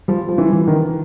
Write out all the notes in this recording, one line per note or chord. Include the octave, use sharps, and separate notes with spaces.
F3 G3
F3
E3
E3
D#3